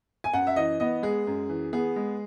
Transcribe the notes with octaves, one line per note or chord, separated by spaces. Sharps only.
G#5
F#2 F#5
E5
E3 D#5
B3 D#5
G#3 G#4
F#2
E3
B3 G#4
G#3